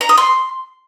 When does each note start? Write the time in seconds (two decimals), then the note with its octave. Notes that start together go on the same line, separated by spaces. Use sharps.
0.01 A#5
0.09 D#6
0.18 C6